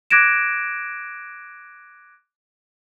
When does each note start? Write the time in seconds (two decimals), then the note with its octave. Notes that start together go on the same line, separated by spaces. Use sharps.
0.10 D6 F#6 G#6 A#6 D7 E7